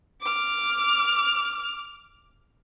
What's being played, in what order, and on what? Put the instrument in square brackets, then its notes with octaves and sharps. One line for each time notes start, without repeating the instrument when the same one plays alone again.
[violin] D6 F6